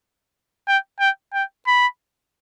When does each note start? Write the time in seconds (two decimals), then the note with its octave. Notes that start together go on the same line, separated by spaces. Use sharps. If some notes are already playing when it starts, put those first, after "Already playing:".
0.68 G5
1.00 G5
1.34 G5
1.67 B5